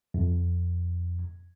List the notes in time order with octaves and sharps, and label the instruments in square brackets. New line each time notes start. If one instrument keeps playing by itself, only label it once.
[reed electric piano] F2